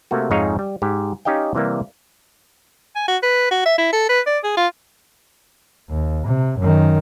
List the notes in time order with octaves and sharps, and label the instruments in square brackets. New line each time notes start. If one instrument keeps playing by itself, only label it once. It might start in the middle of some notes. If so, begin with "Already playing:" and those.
[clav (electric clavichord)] C3 A3 A#3 F#4
F2 G#2 D#4 G#4 C#5 F5
G3
G#2 G4
C#4 D#4 G4 D#5 F5 G5
C3 E3 G3 A#3
[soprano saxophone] G#5
F#4
B4
F#4
E5
E4
A4
B4
D5
G#4
F4
[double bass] D#2
C3
F#2 D#3